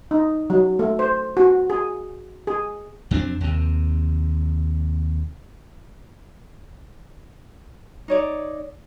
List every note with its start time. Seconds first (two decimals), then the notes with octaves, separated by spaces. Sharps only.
0.11 D#4
0.50 F#3
0.79 A3
0.99 C5
1.37 F#4
1.70 G#4
2.47 G#4
3.11 F2 F#3 C4 D4
3.40 D#2 C3
8.08 D#4 C#5 D5